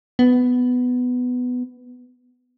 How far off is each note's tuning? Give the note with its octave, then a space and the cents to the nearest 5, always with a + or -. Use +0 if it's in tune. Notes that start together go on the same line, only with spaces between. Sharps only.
B3 +10